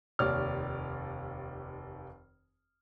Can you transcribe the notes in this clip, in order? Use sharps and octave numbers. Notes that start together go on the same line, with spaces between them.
F1 D#2 C#5 D5 F6